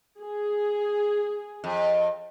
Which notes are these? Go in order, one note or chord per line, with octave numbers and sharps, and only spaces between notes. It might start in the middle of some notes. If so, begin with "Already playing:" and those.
G#4
F2